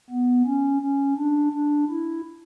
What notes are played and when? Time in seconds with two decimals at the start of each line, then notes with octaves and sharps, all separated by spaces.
0.10 B3
0.46 C#4
0.82 C#4
1.17 D4
1.52 D4
1.89 E4